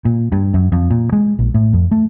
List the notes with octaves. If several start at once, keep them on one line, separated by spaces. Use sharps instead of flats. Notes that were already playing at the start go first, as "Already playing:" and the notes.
A#2
G2
F#2
F2
A#2
G#3
A#1
A2
F2
A3